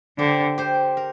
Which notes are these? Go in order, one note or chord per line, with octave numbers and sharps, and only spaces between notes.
D3 G4 C5
G4 C5
A#4